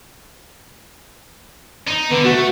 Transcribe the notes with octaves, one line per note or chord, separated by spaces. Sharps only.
D#4
D3 B3
A3 F#4